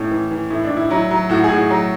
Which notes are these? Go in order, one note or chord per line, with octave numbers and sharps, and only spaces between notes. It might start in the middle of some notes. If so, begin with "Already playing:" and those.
Already playing: A2 C#4
E3
E3
A2 E4
D4
A2
E4
F#3 E4
F#3
A2 F#4
G#4
A2
F#4
F#3